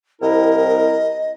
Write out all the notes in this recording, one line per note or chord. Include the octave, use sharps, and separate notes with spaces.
C2 C4 E4 A#4 D#5